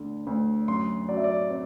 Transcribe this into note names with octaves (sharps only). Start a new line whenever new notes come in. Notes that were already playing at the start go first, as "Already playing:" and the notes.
Already playing: D2 D3
D2
F#2 C6
F#3 D5
E5
D5
C4 D5